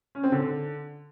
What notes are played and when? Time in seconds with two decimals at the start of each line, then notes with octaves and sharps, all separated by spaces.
0.15 C#4
0.23 C4
0.32 D3